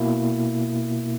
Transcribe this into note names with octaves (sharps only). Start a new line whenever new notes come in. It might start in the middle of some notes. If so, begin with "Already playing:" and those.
Already playing: B2 A#3 E4